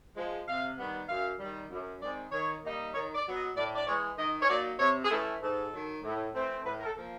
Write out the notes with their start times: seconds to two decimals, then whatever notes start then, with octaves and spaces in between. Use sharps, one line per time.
0.17 F3 G#3
0.47 C3 F5
0.78 D#3 G3 B3
1.09 F#2 F5
1.39 D#3 G3
1.71 F#2
2.02 D#3 G#3 C4 D5
2.32 D#3 C#5
2.64 G3 A#3 D#4
2.94 D#3 C#5
3.15 D5
3.26 F#3 B3
3.36 D#5
3.56 A2 D5
3.75 D5
3.87 E3 G#3 C#5
4.17 D#3 D#5
4.42 C#5
4.48 F#3 A#3 D#4 D5
4.79 C3 C#5
5.05 G#4
5.11 E3 A3 C#4 E4 A4
5.42 G#2 A4
5.72 D#3 F#3
6.03 A2
6.34 E3 A3 C4
6.65 A2 B4
6.80 A#4
6.85 A4
6.96 F3 A#3